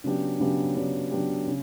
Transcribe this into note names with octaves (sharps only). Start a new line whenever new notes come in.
C#3 F#3 B3 D4 G4
C#3 F#3 B3 D4 G4
C#3 F#3 B3 D4 G4
C#3 F#3 B3 D4 G4
C#3